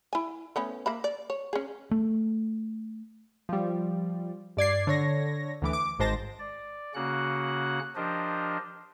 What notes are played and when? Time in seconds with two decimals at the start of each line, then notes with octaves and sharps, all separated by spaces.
0.13 E4 G#5
0.56 A3 B3 C#4
0.86 A#3 E5 B5
1.04 D5
1.30 C#5
1.53 C#4 G#4
1.91 A3
3.49 F3 G3
4.57 G2 D5 G#6 C7
4.87 D3 C#5 A#6
5.62 D2 E3 D6
5.73 D6
5.99 G#1 G#2 G#3 C5 A5 A#6
6.39 D5
6.95 C#3 A#3 C#4 F#4 F#5 F#6
7.96 F3 D4 G4 A#4 C5 D#5